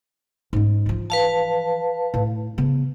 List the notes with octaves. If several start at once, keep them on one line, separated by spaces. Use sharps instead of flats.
G#2 C#4
E3 F3
B4 F5 A5
A2
C#3 B3